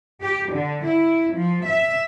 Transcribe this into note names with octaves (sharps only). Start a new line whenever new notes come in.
G4
D3
E4
F3
E5